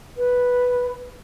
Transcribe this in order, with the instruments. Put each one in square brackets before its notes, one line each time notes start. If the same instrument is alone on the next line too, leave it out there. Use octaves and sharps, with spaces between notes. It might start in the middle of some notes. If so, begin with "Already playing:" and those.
[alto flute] B4